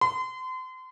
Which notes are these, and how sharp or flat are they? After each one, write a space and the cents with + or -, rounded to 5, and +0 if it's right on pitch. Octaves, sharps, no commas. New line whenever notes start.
C6 -35